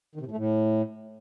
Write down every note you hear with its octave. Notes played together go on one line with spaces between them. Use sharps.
D#3
C3
A2
A3
A2